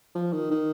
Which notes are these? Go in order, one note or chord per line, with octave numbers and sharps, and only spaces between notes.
F3
D#3
D#3